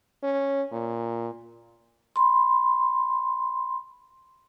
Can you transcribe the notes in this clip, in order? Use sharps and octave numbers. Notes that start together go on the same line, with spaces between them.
C#4
A#2
B5 C6